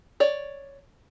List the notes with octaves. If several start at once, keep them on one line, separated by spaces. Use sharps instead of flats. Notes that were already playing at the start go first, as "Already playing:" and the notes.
C#5 D5